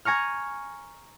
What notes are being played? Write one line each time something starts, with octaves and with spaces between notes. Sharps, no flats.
G#5 A#5 C#6 F6